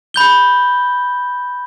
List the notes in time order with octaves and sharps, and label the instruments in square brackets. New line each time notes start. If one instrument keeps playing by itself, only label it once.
[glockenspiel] B5 G6 G7